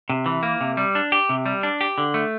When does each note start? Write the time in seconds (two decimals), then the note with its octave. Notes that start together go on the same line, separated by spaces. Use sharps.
0.09 C3
0.26 E3
0.43 A#3
0.61 C3
0.77 G3
0.95 D4
1.12 G4
1.29 C3
1.46 G3
1.63 D4
1.81 G4
1.98 D3
2.14 A3